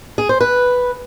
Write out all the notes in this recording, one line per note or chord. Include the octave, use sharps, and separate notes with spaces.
G#4
C5
B4